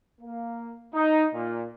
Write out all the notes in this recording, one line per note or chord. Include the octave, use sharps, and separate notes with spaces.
A#3
D#4
A#2